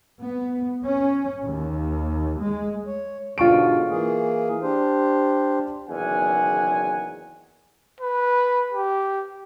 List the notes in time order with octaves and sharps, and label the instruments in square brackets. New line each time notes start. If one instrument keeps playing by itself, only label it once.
[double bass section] B3
C#4
D#2
G#3
[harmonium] C#5
[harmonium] G#2 B2 D3 [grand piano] F4 C#6 D7
[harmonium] E3 A#3 G#4
D4 G4 C5
[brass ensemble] F#1 E2 D#3 F#5 G#5
[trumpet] B4
G4